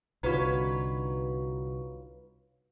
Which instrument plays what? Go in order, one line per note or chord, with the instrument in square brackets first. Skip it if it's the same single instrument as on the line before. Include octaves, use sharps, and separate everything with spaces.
[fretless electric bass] C2 D3 [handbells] D#4 F#4 [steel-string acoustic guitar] F4 B4 C#5